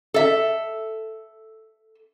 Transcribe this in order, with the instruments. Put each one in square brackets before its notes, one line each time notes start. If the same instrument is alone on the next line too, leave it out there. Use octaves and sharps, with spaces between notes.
[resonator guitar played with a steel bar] A4 E5